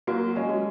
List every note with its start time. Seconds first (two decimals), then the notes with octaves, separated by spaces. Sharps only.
0.07 F#3 A#3 F#4
0.36 G#3 C#4
0.49 F#4